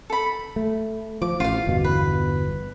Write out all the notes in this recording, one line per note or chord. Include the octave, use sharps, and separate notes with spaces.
A4 B5
A3
F3 D6
A1 F4 F5
G1 E2 B2
B4